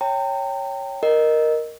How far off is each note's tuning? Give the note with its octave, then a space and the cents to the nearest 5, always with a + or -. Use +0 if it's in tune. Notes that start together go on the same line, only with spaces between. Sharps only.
C#5 +0 G5 +0 A#5 -40
A#4 +0 D#5 -10